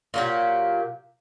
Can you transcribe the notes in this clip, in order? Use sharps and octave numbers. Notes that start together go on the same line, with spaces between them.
A#2 F#3 G4